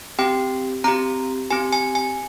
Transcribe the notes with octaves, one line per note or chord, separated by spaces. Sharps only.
C4 G4 G5
C4 G4 A#5
C4 G4 G#5
G#5
G#5